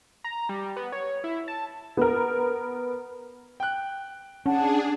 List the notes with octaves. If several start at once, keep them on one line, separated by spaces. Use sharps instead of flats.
A#5
G3
B3
C#5
E4
A5
B3 A#4
G5 F#6
C#4 D4 G#4 F#5 A5